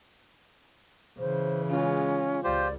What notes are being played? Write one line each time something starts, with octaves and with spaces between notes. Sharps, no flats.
C#3 E3 C5
G#3 C#4 F4
C#2 F4 G4 C5 D5